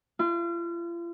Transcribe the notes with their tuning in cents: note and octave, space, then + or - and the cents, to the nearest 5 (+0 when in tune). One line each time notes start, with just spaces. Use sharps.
F4 -40